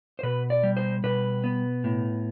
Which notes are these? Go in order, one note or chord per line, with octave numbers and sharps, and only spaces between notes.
C5
B2 B4
D5
G3
C5
B2 B4
B3
A2